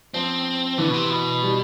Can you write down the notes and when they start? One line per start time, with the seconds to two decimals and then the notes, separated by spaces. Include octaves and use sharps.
0.14 F3 C4
0.78 D3 E3
0.88 B2
0.94 C3
1.10 B2
1.42 G3